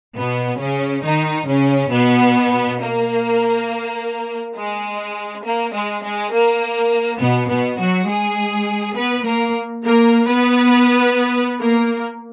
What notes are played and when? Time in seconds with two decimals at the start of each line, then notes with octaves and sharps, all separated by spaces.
0.17 B2 B3
0.60 C#3 C#4
1.04 D#3 D#4
1.48 C#3 C#4
1.92 B2 B3
2.80 A#3
4.56 G#3
5.44 A#3
5.74 G#3
6.04 G#3
6.33 A#3
7.20 B2 B3
7.50 B2 B3
7.79 F#3 F#4
8.08 G#3 G#4
8.96 B3 B4
9.26 A#3 A#4
9.85 A#3 A#4
10.28 B3 B4
11.60 A#3 A#4